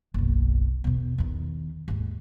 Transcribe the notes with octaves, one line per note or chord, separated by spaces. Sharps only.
F#1 B1
E2 B2
E2 D#3
D#2 G#2